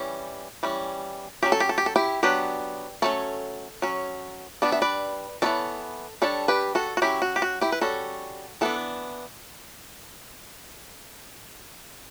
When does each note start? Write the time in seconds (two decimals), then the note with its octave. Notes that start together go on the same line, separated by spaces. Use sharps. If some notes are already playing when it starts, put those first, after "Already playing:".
Already playing: E3 G3 C#4
0.63 E3 G3 C#4
1.43 F#3 C#4 G4
1.52 A4
1.60 G4
1.69 A4
1.78 G4
1.86 A4
1.96 E4 G4
2.23 F#3 B3 D4 G4 B4
3.02 F#3 A3 C#4 A4 C#5
3.82 F#3 C#4
4.62 G3 B3 D4 D5
4.72 E5
4.82 B4 D5
5.42 E3 B3 D4 A4 C#5
6.22 G3 D4 A4 C#5
6.48 G4 B4
6.75 F#4 A4
6.97 F#4
7.02 F#3 C#4 E4 G4
7.22 F#4
7.36 G4
7.42 F#4
7.61 E4 G4
7.72 B4
7.81 G3 C#4 F#4 A4
8.61 E3 B3 D4 A4